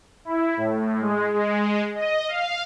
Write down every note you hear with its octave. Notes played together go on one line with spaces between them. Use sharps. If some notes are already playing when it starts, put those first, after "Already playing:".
E4
A2
G#3
G#3
D#5
F5